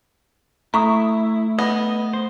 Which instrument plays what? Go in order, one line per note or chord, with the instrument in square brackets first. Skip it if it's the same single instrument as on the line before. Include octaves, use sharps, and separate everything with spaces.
[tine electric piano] A3 [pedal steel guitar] E4 [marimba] A#5 C#6 D#6
[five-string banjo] B3 [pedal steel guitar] D#5
[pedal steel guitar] C5